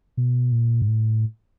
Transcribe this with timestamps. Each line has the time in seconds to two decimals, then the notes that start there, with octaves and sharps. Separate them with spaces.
0.17 B2
0.52 A#2
0.82 G#2
0.88 A2